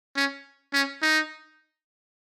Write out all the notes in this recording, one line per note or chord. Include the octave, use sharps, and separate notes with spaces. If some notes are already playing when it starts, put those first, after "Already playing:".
C#4
C#4
D#4